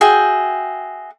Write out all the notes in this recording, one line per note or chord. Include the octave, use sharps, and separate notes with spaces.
F#4 G#4 E5 G5